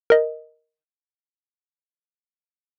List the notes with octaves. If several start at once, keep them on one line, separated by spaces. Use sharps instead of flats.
A#4 D#5